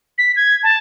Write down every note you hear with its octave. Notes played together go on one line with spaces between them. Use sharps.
B6
G#6
A5